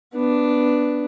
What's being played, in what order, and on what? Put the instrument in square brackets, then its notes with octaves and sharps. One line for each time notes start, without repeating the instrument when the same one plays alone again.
[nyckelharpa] B3 D4